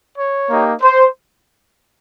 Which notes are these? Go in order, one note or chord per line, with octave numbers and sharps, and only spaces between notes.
C#5
A#3 D#4 G4
C5